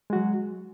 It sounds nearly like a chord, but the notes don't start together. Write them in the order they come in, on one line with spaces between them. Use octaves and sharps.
G#3 F#4 F#3